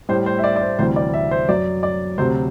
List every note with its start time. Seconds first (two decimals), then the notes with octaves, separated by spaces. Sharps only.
0.09 A2 G3 C5
0.26 C5
0.39 E5
0.44 D5
0.56 D5
0.61 C5
0.79 D2 C3 E3 G3 C5
0.96 D5
1.14 E5
1.31 C5
1.49 F#2 F#3 D5
1.83 D5
2.18 D2 C3 F#3 C5